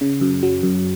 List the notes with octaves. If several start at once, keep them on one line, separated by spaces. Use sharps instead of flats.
C#3
F#2
F#3
F#2